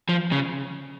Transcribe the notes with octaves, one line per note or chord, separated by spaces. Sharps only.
F3
C#3